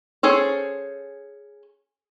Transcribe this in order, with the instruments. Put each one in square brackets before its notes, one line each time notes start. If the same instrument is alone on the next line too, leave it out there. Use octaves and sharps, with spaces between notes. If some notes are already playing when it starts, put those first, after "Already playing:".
[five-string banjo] C#4 G#4 A4 C5